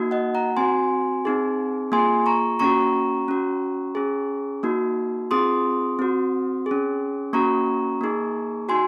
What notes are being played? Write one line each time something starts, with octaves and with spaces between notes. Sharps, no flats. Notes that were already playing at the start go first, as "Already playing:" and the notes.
Already playing: A#3 D#4 F#4
D#5 F#5
F#5 A#5
C4 F#4 G#5 C6
C4 D#4 G#4
A#3 F4 G#4 G#5 C6
A#5 C#6
A#3 C#4 F#4 A#5 C#6
C#4 F#4
C#4 G#4
A#3 D#4 F#4
C4 F4 G#4 C6 D#6
C4 F#4
G#4
C#4
A#3 C#4 F#4 A#5 C#6
A#3 D#4 G#4
D#4 F#4 G#5 C6